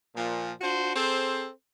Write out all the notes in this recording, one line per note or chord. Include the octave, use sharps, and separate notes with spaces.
A#2 F3
D4 F4 F#4 C5
C4 G#4 A4 C5